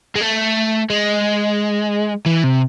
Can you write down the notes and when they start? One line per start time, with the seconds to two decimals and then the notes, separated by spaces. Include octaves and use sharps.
0.16 G#3
0.21 A3
0.90 G#3
2.26 E3
2.44 C3